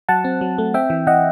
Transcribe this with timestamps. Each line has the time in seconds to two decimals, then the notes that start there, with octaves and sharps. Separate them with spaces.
0.09 F#3 F#5 A5
0.24 C4
0.41 F#3
0.58 A3
0.74 C4 E5 G5
0.90 E3
1.07 E3 D#5 F#5